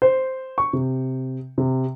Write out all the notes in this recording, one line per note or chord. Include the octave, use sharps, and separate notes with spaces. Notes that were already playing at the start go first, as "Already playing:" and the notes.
C5
C#6
C3
C3